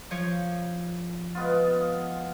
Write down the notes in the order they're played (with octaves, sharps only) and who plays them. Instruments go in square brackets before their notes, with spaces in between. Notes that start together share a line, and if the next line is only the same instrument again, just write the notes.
[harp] F3 C#5
[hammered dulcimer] G#3 B3 F4